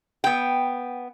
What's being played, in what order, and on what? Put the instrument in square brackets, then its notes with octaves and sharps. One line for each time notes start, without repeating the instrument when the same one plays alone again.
[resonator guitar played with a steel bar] B3 G5